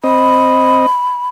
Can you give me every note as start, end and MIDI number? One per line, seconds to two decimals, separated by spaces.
0.04 0.86 60
0.04 0.86 75
0.04 1.28 83